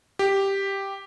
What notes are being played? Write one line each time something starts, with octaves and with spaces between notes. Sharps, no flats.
G4